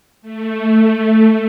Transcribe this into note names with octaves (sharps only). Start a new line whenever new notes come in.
A3